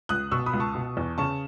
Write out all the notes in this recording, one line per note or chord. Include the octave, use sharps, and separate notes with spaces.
C#2 D#6 F#6
B2 C#6 E6
B5 D#6
C#2
A5 C#6
B2
E2
C#3 A5 C#6